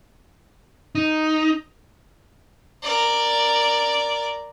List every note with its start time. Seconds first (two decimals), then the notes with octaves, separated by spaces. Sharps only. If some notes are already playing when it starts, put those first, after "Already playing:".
0.95 D#4
2.83 A#4 D5